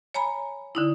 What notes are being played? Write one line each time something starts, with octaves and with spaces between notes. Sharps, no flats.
C#5 G#5 A#5 B5
D3 D#4 E4